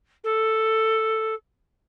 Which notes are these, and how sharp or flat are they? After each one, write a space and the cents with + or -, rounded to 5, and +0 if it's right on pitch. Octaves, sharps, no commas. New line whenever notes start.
A4 +5